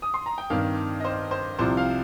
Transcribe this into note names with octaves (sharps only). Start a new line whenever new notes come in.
D#6
C6
A#5
G5
G2 D#3 C4 F5
D#5
C5
C5
C2 C3 F3 C5
F5